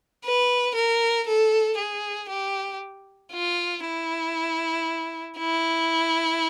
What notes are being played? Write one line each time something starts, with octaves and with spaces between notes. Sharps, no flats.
B4
A#4
A4
G#4
G4
F4
E4
E4